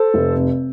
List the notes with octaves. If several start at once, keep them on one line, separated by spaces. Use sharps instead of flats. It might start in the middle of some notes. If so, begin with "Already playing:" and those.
Already playing: A4 C5
F1
C3